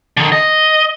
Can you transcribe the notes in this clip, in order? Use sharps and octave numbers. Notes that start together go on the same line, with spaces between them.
D3 D#3
D#5